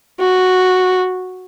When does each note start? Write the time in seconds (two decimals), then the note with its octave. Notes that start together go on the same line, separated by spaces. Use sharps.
0.19 F#4